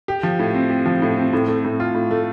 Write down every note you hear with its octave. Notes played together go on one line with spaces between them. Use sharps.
G4
F3
A2
C4
G4
F3
A2
C4
A2
A3
A2
F4
A2
A3